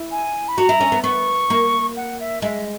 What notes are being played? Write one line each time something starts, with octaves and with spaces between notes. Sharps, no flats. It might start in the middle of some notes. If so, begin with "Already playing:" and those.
Already playing: E4
G#5
B5
F#4 A#5
E4
C#4
B3
B3 C#6
A#3
F#5
E5
G#3 E5